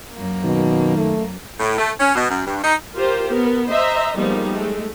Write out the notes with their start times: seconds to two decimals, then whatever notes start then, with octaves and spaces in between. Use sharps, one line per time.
0.13 F#2 A#3
0.44 B2 D#3
0.97 A3
1.60 A2
1.78 A3
2.00 C#4
2.15 B2
2.30 F#2
2.46 G2
2.64 D#4
2.94 F4 G4 A#4 C5
3.30 B3 A#4
3.68 C5 D#5 E5 A#5
4.15 F3 G3 G#3 A#3 B3 D#4
4.51 G#3 A3